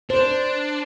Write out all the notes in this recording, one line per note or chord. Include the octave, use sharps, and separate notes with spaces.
D4 C5